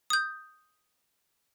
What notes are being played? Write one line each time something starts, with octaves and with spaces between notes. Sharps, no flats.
D#6 G6